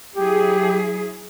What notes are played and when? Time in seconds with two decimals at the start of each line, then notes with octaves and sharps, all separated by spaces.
0.16 F#3 E4 G4 G#4